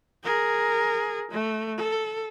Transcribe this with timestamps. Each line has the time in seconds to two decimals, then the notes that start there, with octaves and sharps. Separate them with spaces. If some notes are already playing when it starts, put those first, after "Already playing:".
0.24 G#4 A#4
1.31 A3
1.78 A4